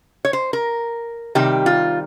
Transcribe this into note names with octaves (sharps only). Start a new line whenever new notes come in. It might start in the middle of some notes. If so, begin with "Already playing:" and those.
C#5
C5
A#4
C3 D#3 G3 G4
F4